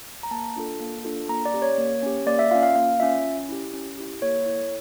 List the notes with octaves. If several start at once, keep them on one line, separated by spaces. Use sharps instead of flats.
A#5
A#3 A5
D4 F4 A4
A#3
D4 F4 A4
A#3 A#5
D5
C#4 G4
C#5
A#3
C#4 G4
A#3 D5
E5
C#4 F4 F5
F5
A#3 F5
C#4 F4 E5
C#4
E4 G4
C#4
E4 G4
A#3 C#5
E4 A4